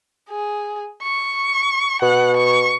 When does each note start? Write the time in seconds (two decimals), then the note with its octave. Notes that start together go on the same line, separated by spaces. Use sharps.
0.30 G#4
1.03 C#6
2.02 B2 F#5
2.36 C#6